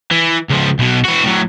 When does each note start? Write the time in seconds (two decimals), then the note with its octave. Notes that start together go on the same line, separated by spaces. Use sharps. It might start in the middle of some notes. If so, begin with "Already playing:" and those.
0.11 E3
0.49 C#2 F3
0.79 B1 B2
1.05 E3 F#4
1.24 A2 F#3